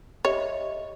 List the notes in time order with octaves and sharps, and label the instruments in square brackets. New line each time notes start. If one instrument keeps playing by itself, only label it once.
[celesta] G4 D#5 E5 [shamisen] C#5